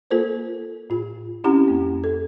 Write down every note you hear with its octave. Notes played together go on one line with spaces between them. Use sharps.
A#3 F4 A4 A#4 C5
A2 F4
C4 C#4 E4 G4 F#5 A#5
F2 A#3
A4